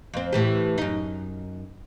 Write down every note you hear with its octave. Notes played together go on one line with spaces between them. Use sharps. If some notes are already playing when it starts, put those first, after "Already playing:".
F2 C4
A2 E3 G4
F#2 D#4